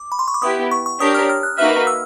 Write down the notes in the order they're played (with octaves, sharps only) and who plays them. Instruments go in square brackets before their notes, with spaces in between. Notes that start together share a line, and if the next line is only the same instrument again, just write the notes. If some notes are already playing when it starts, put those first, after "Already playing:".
Already playing: [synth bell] D6
B5
C6
C#6
D6
[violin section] B3 E4 G4 [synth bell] D#6
[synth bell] C#6
C#6
[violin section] D4 G4 A#4 C#5 [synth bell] D#6
[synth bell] F6
F6
F#6
[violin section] A#3 D#4 F#4 B4 E5 [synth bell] F6
[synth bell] E6